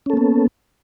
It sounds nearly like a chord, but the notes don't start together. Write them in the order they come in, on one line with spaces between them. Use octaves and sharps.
C#4 A4 A#3 B3